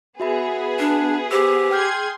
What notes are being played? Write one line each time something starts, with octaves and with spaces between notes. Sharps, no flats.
B3 F#4 G#4 E5 B5
D4
G4 C5 E6
G#4 G5 C6 F6 G6 G#6